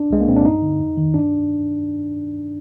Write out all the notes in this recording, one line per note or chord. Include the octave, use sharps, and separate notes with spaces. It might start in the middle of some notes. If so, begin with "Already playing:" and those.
Already playing: D4
C2 G#3
A#3
A#2 C4
D4
G2 D#4
D3
F2
D#3
G2 D4